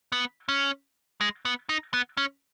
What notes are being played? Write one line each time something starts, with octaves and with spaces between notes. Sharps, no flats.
B3
C#4
G#3
B3
D#4
B3
C#4